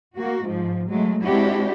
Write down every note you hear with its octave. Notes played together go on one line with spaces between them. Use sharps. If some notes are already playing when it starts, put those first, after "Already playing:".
A#3 F#4
G#2 F3
F#3 G#3 A3
G#3 C4 D4 E4 F#4 G4